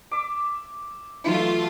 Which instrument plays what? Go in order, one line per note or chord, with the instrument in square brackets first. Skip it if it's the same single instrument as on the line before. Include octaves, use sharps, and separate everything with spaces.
[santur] E5 D6
[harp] E3 F#3 [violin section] A3 F4 [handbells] D#4